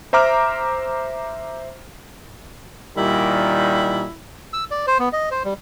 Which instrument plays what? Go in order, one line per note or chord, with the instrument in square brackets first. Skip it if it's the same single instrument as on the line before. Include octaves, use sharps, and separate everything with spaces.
[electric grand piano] C5 E5 A#5 D6 F6
[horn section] A#2 D#3 G3 [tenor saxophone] E4
[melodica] E6
D5
C5
B3
D#5
C5
G3